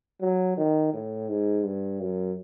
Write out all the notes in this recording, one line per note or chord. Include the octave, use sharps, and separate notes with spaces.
F#3
D#3
A2
G#2
G2
F#2